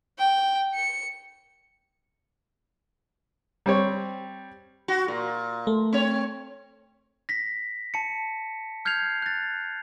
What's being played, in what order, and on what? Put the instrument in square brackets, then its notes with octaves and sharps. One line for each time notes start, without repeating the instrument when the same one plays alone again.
[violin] G5
C#7
[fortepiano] G3 C4 C#5
[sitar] F#4
A#2
[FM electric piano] A3
[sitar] C4 C#5
[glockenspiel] A#6 B6
A5 C#7
F6 G6 G#6 C7 F7
F#6 A6